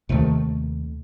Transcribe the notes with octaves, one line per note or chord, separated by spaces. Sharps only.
D#2 C3 D#3 A3